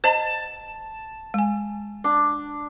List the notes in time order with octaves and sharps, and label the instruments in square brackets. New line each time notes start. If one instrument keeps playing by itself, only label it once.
[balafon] C5 D#5 A#5 [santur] A5
[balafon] G#3 G#5
[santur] D4